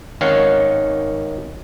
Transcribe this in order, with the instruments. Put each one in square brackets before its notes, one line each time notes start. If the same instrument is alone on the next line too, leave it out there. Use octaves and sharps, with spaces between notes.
[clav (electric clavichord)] G#1 D#3 C#4 C#5 F5 F#5